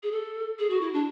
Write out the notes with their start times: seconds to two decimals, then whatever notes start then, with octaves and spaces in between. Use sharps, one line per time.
0.03 G#4
0.12 A4
0.59 G#4
0.70 F#4
0.81 E4
0.93 D4